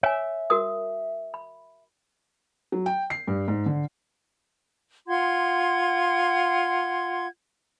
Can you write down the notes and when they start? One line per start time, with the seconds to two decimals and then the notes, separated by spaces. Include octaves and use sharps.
0.03 C#5 E5 G#5
0.50 F#4 A#4 D#6
1.34 B5
2.72 F#3
2.86 G5
3.10 C7
3.27 G2
3.48 G#2
3.66 D3
5.07 F4 F#5 C6 G#6